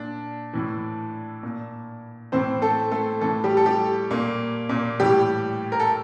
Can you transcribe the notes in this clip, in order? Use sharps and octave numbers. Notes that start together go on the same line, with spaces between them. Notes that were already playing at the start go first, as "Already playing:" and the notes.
Already playing: A#2 D4
A2 E3
A#2
A2 E3 C4 C5
A3 A4
A3 A4
A2 E3 A3 A4
G3 G4
A4
G3 G4
A#2 A#3
A#2 A#3
A2 E3 G3 G4
A#4
A4